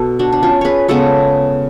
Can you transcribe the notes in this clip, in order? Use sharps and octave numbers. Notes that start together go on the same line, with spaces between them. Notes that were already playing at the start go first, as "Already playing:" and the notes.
Already playing: B2 A4
D4 F#4
D4
C#4 F4
G#4 B4 C#5
C#3 G#3 B3 A4 C#5